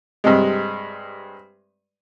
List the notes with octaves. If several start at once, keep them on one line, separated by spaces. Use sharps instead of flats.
G2 C3 G#3